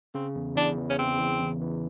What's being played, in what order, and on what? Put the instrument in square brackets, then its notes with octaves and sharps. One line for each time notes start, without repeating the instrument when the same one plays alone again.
[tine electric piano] C#3 [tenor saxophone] C4
[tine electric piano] E2
[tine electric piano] E2 [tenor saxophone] D4
[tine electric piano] E3
[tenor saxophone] C#4
[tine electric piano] C#3 [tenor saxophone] C4
[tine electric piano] E2
E2
E3